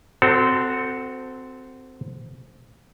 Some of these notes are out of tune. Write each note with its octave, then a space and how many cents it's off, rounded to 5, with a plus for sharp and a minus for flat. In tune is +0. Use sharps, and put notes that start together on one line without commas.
C4 -15 F#4 +0 A4 +15